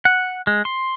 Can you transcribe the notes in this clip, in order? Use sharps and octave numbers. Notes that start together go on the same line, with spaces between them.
F#5
G#3
C6